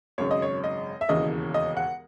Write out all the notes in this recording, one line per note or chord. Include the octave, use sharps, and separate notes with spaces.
G#1 F#2 C#3 C#5
D#5
C#5
D#5
E5
E1 D#2 C#3 E3 D#5
D#5
F#5